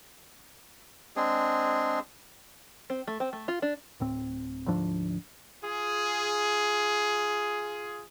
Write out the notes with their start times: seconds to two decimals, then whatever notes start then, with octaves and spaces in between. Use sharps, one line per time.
1.16 G#3 C4 D4 G#4
2.90 C4
3.08 A3
3.20 C4
3.33 A3
3.48 F4
3.62 D4
4.00 D1 A2 C4
4.67 D2 G#2 F3 D4
5.63 F4 G#4